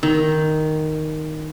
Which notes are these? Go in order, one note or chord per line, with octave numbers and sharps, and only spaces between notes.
D#3